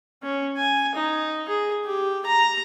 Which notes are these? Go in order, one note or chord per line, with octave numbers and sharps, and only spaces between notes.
C#4
G#5
D#4
G#4
G4
A#5